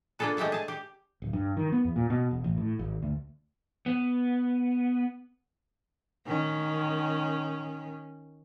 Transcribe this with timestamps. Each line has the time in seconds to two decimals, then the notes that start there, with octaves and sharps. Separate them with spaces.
0.19 A#3 D4 F4 G#4 A4 B4
0.37 G#3 A3 G4 E5 F#5
0.52 G#4 A5
0.68 G4
1.22 D1
1.33 G2
1.57 D#3
1.72 B3
1.85 E2
1.96 A#2
2.10 B2
2.31 E1
2.44 A1
2.57 A2
2.79 G#1
3.02 D2
3.86 B3
6.27 D#3 C#4